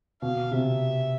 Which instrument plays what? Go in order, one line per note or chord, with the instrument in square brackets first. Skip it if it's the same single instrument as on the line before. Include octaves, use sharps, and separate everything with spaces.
[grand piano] B2 [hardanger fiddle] F5
[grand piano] C3 [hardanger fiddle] E5